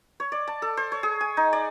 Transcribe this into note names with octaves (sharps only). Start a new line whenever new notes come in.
C#5
D5
A5
A4
C5
C#5
G#4
G#5
D#4
D5